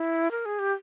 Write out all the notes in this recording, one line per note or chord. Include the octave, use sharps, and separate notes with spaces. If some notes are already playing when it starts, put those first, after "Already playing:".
Already playing: E4
A#4
G#4
G4